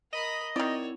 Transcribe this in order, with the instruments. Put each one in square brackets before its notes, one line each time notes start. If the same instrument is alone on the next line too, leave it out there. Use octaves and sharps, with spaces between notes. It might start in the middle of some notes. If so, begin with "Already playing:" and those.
[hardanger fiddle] A#4 B5 [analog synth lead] D#5
[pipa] D#3 D5 [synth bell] C4 E4 [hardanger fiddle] F#4 C#5